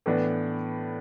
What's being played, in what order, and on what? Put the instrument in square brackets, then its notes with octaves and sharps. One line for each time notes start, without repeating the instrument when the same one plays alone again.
[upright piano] A2 E3 B3 D4